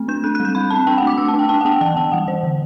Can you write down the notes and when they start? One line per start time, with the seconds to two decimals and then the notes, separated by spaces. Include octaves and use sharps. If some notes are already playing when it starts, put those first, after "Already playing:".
Already playing: A3 C4
0.08 D4 G6
0.24 C4 F#6
0.35 F#6
0.40 G3
0.45 G6
0.55 G3 B5
0.70 C4 A5
0.87 D4 G5
0.98 F#5
1.02 A3 D6
1.18 D4 E6
1.28 A5
1.33 D4
1.39 G5
1.49 D4 A5
1.61 F#5
1.65 B3 G5
1.81 E3 A5
1.96 E3 G5
2.12 G3 F#5
2.27 E3 C5
2.43 D3